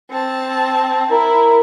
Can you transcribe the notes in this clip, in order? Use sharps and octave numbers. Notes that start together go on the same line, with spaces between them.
C4 A5
E4 A#4